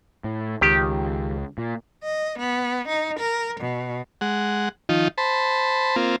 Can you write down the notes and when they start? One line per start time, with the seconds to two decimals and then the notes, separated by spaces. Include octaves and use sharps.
0.24 A2
0.61 C#2 D#3 G4
1.58 A#2
2.03 D#5
2.39 B3
2.88 D#4
3.19 A#4
3.60 B2
4.21 G#3 F#5
4.89 D#3 F3 D#4 F4
5.18 C5 A5 B5
5.96 A#3 C4 F4